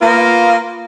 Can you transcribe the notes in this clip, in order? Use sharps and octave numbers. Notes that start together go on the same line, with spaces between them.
A#3 B3 F4